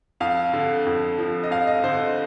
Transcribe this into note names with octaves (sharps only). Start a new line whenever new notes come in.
F2 F5
D3
F2
F3
D#5
F2 F5
D#5
D3 C5